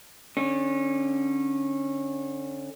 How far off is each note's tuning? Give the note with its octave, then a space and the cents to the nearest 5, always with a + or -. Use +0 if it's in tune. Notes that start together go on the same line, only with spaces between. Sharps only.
D3 +0 C#4 -25